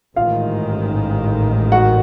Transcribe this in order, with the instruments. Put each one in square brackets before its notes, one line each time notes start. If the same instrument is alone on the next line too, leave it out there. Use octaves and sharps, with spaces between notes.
[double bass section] A1 G#2 D#3 [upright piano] F4 F5
[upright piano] F#4 F#5